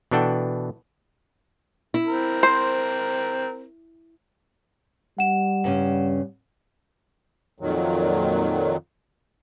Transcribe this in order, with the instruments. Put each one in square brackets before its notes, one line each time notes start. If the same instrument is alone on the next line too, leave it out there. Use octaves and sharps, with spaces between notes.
[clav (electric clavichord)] B2 E3 D4 A4 F#5 G5
[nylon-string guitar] E4
[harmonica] C4 A#4
[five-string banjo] C5
[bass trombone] G3 [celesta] F#5 E7
[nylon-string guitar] G2 C#3 C#4
[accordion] F2 A#2 D#3 F#3